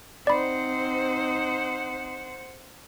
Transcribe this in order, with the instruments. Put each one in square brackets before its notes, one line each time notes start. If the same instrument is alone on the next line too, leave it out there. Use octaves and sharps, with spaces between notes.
[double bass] C4 D#4 [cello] C5 F#5 [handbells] D5 B5